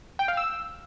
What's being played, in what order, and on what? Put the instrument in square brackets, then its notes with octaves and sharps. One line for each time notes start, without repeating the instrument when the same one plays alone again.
[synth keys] G5
F5
E6